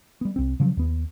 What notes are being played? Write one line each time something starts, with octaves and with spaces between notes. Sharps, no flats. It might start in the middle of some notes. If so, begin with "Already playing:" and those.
G3 B3
C2 C4
C#3 F3 F#3
D#2 B3